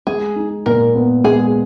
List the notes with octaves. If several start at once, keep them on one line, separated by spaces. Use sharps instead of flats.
G#3 G#4
D#4
A#2 A#4
B3
G#3 G#4